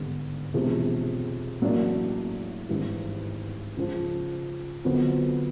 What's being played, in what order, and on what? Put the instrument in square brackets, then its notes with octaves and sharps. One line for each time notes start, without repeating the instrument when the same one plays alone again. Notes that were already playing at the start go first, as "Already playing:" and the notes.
Already playing: [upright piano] G#1 G2 D3 G3 B3
E1 E2 C3 F3
A1 A2 F#3 A#3 D4
G#1 G2 E3
C#2 C#3 F3
F2 D3 F#3 B3